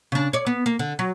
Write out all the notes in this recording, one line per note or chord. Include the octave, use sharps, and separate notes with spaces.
C#3 D4
C#5 D5
B3
A#3
D3
F#3